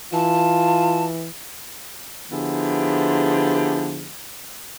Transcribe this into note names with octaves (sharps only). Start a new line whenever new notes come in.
E3 F4 A5
D3 F3 B3 E4 G4 G#4